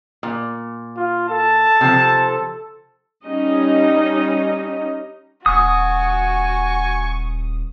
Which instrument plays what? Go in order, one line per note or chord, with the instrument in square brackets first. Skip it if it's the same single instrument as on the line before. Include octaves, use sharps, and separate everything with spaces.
[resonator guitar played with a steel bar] A#2
[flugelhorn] F4
[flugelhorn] A4 [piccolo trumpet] A5
[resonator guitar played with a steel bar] C3 F3
[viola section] G3 C#4 D#4 D#5
[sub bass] D#1 [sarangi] F#4 [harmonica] G#5 C#6 [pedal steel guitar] D#6